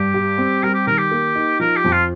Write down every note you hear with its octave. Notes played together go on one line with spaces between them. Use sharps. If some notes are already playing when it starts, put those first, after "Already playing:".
Already playing: G2 G4
G3
C4
G3 A#4
G4
D#3 A#4
G4
A#3
D#4
F3 A#4
G4
F2
F4